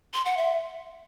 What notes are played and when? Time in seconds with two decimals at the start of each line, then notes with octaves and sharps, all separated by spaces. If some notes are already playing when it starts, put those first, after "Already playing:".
0.14 C6
0.25 F#5
0.37 E5